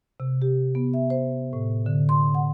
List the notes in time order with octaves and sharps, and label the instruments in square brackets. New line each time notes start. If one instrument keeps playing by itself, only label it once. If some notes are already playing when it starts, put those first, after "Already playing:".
[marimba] C3
G4
B3
E5
C5
A2
D3
C6
F#5